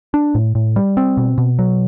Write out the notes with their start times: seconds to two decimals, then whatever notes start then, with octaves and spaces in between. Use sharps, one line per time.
0.14 D4
0.35 A2
0.55 A2
0.76 G3
0.97 C4
1.17 B2
1.38 B2
1.59 F#3